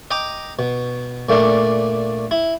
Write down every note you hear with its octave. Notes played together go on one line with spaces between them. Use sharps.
D#5 G5 A#5 D6
B2
A#2 A3 A#3 D4
E4